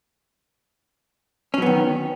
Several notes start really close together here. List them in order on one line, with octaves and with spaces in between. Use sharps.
C#4 F#3 B3 D#3